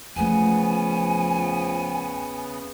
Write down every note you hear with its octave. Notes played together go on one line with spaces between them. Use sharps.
E2 C#3 F3 A3 B3 G#5